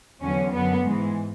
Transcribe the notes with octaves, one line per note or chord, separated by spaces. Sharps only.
E2 D3 F#3 C#4
F#2 D3 F#3 B3
G#2 E3 G#3